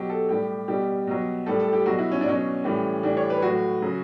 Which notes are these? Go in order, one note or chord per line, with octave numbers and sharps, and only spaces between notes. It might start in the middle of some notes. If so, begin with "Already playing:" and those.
Already playing: B2 F#3 G4
A4
A2 G3 G4
B2 G3 G4
B2 F#3
A2 G3 A4
A4
G4
B2 F#3 F#4
E4
C#4
D4
B2 F#3 C#4
A2 E3 G3
A2 E3 G3 D4
C#5
B4
A2 F#3 F#4
C#3 F#3